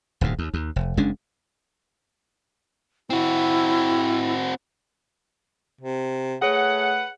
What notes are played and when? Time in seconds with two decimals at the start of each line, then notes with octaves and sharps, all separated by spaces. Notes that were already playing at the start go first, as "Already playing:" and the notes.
0.21 D#1 D2 G#2
0.39 D#2
0.54 D#2
0.76 F1
0.97 F#1 G#3 C#4 D4
3.10 C4 E4 F#4
5.81 C3
6.42 A3 G#4 B4 C#5 F#5